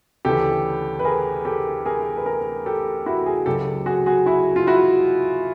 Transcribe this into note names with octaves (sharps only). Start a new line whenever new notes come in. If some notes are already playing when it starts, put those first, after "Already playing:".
D2 C#3 E3 G4 A4
B4
G#4 A#4
G4 A4
G#4 A#4
B4
G#4 A#4
G4 A4
E4 F#4
G#4 A#4
C#2 C#3 F#3 G4 A4
F#4 G#4
F#4 G#4
E4 F#4
F4
E4 F#4